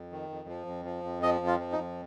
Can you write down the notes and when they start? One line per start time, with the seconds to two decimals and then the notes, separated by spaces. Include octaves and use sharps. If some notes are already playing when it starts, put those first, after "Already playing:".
Already playing: F2
0.12 D#3
0.30 F2
0.49 F3
0.66 F2
0.85 F3
1.04 F2
1.23 F3 D#5
1.41 F2
1.47 F4
1.60 F3
1.72 D#4
1.79 F2